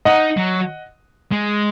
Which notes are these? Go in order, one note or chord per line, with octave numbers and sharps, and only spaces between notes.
D#4 D#5 F#5
F#3
G#3